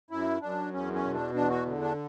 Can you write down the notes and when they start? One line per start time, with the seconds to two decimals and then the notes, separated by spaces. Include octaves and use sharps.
0.11 F#2 E4
0.42 F#2 D4
0.73 E2 C#4
0.93 C#4
1.03 B2
1.14 D4
1.35 E2 D4
1.50 F#4
1.66 D3
1.81 D4